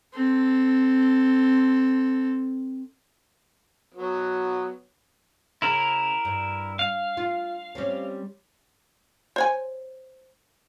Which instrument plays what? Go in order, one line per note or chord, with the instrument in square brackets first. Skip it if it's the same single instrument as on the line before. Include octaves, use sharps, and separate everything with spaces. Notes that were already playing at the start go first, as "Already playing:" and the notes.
[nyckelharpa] C4 A4
[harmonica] F#3 B3
[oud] C#3 [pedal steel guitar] E4 A#4
[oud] G2
[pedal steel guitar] F5
[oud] F4
G3 C4 C#4
[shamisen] C5 C#5 G#5